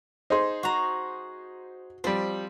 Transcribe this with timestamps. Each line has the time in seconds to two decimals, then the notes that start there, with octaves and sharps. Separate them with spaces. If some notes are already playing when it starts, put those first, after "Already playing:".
0.30 D#4 G#4 C5 C6
0.63 F#4 A#5
2.04 F3 G3 C4